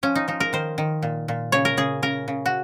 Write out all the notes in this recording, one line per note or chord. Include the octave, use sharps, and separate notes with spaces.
F3 C#4
D#4
F3 D#4
A#4
D#3 C5
D#3
A#2
A#2
C#3 C#5
A#4
C#3 G#4
C#3 A#4
C#3
F#4